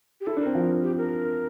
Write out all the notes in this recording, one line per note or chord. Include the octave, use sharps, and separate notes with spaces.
G4
E4 A4
D4
C4 A#4
F3
G4
A#4